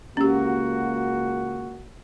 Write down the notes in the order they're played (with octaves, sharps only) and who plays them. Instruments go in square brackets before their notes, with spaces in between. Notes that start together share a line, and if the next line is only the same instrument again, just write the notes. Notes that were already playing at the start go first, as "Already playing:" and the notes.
[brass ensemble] C#2 A#3 F#4 [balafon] C#4 G4